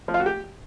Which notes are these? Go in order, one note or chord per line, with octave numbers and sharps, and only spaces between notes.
F3
F4
F#4
G4